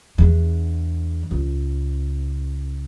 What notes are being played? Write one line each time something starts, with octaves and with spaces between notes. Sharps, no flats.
E2 D4
C#2